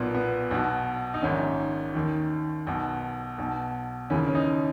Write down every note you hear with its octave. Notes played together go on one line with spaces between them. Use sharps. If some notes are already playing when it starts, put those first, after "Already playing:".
Already playing: B1 A#2 B3
B3
B1 B2
D#4
A#1 G#2 D#3 C#4
D#2 D#3
B1 B2
B1 B2
D#2 C#3 E3 C#4
C#4
D#4